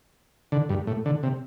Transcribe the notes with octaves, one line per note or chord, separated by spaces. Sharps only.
D3
G2
A2
D3
C3